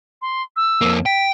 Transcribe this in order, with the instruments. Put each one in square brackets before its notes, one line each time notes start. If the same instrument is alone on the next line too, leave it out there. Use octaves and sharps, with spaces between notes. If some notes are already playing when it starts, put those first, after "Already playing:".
[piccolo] C6
E6
[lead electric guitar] F2 A#3
[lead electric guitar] G5 [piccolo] B6